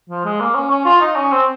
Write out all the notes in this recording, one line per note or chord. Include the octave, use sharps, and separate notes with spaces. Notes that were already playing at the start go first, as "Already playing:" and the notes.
F3
G#3
A#3
C#4
C#4
F4
D#4
C#4
C4